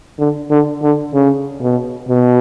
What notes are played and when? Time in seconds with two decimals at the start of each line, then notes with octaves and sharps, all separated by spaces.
0.19 D3
0.51 D3
0.82 D3
1.14 C#3
1.61 B2
2.09 B2